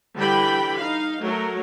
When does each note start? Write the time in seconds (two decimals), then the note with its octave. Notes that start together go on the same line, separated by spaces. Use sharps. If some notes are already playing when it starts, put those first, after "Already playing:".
0.18 D3 E3 G3 G4 G5 B5
0.77 D#4 F5
1.23 F#3 A3 A#4